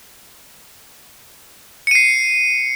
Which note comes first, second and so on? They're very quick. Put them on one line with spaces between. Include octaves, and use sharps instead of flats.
C#7 D#7 C7